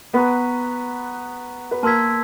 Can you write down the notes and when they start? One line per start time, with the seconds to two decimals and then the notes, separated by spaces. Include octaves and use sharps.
0.13 B3 B4 A#5 C#6 F#6 B6
1.71 B4
1.83 A#3 A#4 A5 C6 E6 G#6 B6